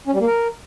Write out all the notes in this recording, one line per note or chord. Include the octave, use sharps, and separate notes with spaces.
C#4
G3
A#3
A#4